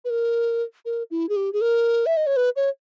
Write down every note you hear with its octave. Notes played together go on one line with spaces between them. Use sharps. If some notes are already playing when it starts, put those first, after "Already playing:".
B4
A#4
A#4
E4
G#4
G4
G#4
A#4
E5
D#5
C#5
B4
C#5